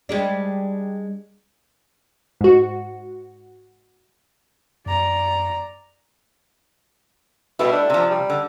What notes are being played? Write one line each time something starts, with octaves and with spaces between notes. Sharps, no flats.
G3 G#3 D4
G#2 F#4
F#2 D5 A#5
B2 G3 A3 E4
D4
C3 F3
G3
D3